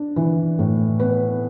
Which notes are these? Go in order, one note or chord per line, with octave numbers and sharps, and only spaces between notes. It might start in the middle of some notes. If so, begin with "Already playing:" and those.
Already playing: D4
E3
A2
B3 B4